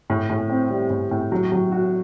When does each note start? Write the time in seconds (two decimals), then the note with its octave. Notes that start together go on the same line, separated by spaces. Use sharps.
0.10 A2
0.30 A2
0.49 C4
0.70 G3
0.90 A2
1.11 A2
1.32 F#3
1.52 F#3
1.72 F#4